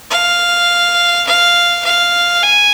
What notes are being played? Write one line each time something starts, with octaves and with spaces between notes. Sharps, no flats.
F5
F5
F5
G#5